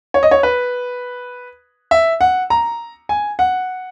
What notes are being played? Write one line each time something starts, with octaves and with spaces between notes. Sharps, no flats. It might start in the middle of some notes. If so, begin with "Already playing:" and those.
C#5
D#5
C#5
B4
E5
F#5
A#5
G#5
F#5